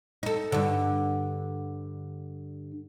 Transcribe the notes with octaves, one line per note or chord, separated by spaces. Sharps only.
D#4 A4
G2 D3